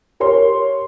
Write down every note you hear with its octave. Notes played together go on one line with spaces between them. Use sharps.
G4 A#4 C#5 C6